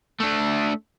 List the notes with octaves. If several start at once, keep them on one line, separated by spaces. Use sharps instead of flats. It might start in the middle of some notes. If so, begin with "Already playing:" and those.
A3 D4